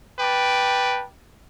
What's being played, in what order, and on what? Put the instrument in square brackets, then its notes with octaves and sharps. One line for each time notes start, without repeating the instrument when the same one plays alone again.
[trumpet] B4 [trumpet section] G5 A5 D6